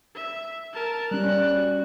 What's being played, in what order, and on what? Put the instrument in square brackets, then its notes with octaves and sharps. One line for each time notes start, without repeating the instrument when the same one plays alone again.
[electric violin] E5
A#4 A5
[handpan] G3 C#4 [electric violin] F#6
[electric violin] F#4